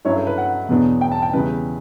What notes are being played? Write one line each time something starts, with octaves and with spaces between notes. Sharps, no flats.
G2 F#3 C#4 E4 C#5
A4
B4
F#5
E2 B2 F#3 B3 D4
G5
A5
G5
E2 C#3 G3 B4